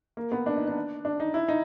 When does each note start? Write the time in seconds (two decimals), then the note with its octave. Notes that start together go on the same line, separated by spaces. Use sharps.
0.17 A#3
0.32 B3
0.46 D4
0.56 D#4
0.68 D4
1.05 D4
1.20 D#4
1.34 E4
1.48 D#4